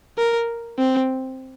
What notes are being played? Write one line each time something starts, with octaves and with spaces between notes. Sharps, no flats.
A#4
C4